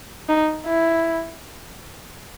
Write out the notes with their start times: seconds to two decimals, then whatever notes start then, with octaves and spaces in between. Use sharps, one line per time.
0.29 D#4
0.66 E4